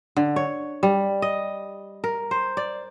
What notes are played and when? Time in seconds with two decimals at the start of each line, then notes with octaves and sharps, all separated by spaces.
0.17 D3
0.36 C#5
0.83 G3
1.22 D#5
2.04 A#4
2.31 C5
2.57 D5